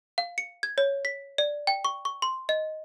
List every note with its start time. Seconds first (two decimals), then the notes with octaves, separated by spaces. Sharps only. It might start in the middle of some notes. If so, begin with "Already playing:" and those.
0.18 F5
0.38 C#7
0.63 G#6
0.78 C#5
1.05 B6
1.38 D5
1.67 G5
1.85 C#6
2.05 C#6
2.22 C6
2.49 D#5